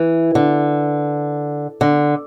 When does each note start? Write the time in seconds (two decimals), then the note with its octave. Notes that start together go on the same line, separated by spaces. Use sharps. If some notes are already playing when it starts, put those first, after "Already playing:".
Already playing: E3
0.35 D3
1.81 D3